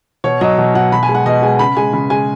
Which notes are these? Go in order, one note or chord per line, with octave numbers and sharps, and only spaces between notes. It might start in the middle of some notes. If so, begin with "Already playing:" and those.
B2 C#5
F#3 D#5
B2 D#5
F#3 F#5
B2 B5
G#5
G#3
F#5
B2 D#5
G#3 G#5
C#3 B5
G#3 G#5
C#3 B5
G#3 G#5